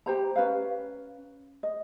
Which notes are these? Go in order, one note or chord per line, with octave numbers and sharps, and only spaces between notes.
G4 C5 A#5
C#4 B4 F5
D#5